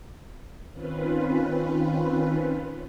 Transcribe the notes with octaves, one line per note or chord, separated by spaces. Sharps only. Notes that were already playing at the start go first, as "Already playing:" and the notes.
D#3 C4 C#4 F4 B4